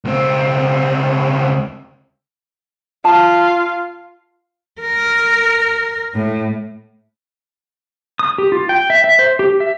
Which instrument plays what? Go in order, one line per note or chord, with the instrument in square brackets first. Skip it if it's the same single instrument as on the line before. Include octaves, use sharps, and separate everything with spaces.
[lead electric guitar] C#2 C4
[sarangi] F4 [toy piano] A5
[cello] A#4
A2
[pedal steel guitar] D#6
G4
F4
G5
E5
E5
C5
G4
E5